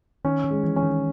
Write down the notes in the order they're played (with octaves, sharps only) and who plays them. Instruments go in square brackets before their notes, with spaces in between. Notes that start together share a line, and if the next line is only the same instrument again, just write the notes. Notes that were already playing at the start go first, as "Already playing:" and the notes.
[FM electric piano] D#3 [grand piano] C#4
[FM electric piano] D#3
[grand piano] G#3
[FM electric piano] E3
[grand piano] C#4
[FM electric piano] D#3